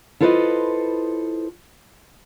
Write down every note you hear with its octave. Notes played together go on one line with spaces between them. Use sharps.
E4 F4 A4 B4 C5 D#5